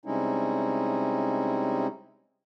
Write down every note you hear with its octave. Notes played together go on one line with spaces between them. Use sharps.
C3 G3 G#3 C#4 D#4 E4